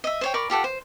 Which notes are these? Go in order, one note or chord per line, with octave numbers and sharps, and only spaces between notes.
D#5 E5
C5 C#5 G5
A#4 D5 B5 C#6
F4 G4 A4 F#5
C5